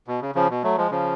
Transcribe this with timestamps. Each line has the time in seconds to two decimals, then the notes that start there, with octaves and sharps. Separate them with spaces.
0.07 B2
0.22 C#3
0.35 C#3 F3
0.50 B2
0.64 F#3 A3
0.78 F3 G#3
0.91 C#3 F3